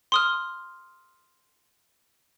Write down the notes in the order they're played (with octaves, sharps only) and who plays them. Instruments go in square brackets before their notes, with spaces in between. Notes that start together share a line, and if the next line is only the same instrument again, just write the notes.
[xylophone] C6 D#6 F6